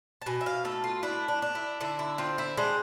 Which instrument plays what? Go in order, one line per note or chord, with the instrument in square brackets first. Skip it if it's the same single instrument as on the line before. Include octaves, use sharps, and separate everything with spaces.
[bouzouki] A5
B2 G#5
E5
F5
A3 A4
F4
D4 E4
D4
D4
E4
D3 E4
E4
C4 F4
E4
G#3 D4